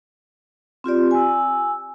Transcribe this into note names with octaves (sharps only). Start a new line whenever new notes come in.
C4 F4 G4 D5
G#5 E6